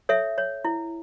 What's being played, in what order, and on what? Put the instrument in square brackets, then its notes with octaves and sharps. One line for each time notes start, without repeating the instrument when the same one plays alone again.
[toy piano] A4 C#5 E5
C#5
E4